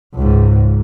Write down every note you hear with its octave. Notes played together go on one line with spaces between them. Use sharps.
C#2 G#2